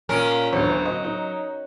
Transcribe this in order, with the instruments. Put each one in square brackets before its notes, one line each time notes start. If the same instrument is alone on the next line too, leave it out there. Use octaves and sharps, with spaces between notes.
[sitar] A#2 C#4 A#4
[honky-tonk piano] G1 D2 [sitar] F#3
[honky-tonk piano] D#5
D#4